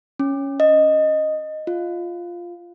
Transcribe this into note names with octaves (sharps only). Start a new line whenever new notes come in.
C#4
D#5
F4